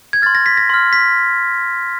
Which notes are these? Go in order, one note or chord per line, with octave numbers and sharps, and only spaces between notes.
G#6
C6 F6 A6
A#6
B6
A#6
C6 F6
B6